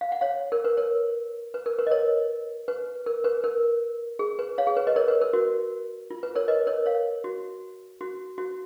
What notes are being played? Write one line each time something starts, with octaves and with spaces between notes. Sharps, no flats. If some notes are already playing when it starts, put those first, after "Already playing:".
F5
F#5
C#5 F5
A#4
B4
A#4 C#5
B4
A#4
B4
D#5
A#4 C#5
B4
A#4
B4
A#4
G#4
B4
C#5 F5
G#4
B4
B4 D#5
A#4 C#5
B4
A#4
F#4
F4
B4
A#4 C#5
B4 D#5
A#4 C#5
C#5 F5
F#4
F#4
F#4